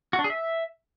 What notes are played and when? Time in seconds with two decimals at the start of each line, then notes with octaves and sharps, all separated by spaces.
0.13 F#4
0.19 D4
0.24 G#4
0.30 E5